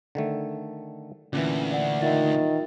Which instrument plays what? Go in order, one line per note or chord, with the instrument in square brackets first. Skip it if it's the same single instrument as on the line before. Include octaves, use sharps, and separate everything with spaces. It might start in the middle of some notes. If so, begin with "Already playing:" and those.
[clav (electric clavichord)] D3 D#3 A3
[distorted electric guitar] D2 [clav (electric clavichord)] A#2 E3 [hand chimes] C#4
[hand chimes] D5 F#5
[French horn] D#3 [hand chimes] F4 E5 A6